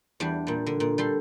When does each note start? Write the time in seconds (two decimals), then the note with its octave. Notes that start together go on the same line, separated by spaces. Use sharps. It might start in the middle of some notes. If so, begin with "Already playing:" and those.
0.20 E2 G3 D4
0.47 A#2 G3
0.66 D3
0.80 A#2
0.98 G3 A4 C6